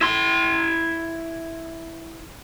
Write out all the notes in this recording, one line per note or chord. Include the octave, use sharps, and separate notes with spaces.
E4 C6